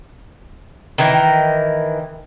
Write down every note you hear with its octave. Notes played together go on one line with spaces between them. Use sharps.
D#3 E3